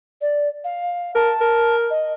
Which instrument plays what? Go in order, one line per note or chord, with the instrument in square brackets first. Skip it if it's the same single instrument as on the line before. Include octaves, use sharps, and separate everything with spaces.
[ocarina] D5
F5
[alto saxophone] A#4 [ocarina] A5
[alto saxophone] A#4
[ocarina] D#5